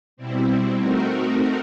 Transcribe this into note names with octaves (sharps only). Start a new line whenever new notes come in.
B2 G3 C4 E4
A3 C4 D#4 F#4 A#4